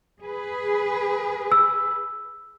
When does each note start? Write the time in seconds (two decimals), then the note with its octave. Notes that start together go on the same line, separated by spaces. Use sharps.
0.21 G#4 B4
1.52 E6